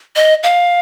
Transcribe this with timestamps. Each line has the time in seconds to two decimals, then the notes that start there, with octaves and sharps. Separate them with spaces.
0.16 D#5
0.43 F5